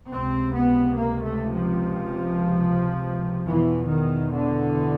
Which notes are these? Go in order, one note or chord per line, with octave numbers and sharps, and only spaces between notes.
C#2 C3 C4
B3
A#3
A3
F3
E2 B2 E3
D#3
D3